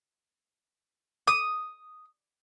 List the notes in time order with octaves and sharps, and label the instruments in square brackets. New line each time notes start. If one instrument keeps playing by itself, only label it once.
[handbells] D6 [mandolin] D#6